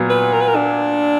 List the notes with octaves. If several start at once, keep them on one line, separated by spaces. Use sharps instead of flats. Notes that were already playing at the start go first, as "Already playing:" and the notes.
Already playing: A#2 F#3 B3
B4
A#4
B4
A#4
D4